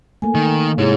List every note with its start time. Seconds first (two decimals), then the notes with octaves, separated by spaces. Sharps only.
0.22 A3 A#3 G#5
0.35 D#3
0.78 G#2 C3 G#3 E4 G#4 C#5